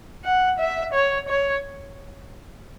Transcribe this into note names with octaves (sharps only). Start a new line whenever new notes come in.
F#5
E5
C#5
C#5